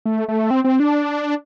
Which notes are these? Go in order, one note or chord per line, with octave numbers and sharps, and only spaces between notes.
A3
A3
C4
C4
D4